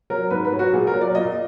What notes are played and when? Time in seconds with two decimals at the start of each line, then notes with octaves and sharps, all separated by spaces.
0.10 F#3 A#4
0.31 G#2 B4
0.45 B4
0.53 F#3
0.59 F#4
0.73 A#2 G#4
0.87 A#4
0.94 F#3
1.01 D5
1.15 A#2 D#5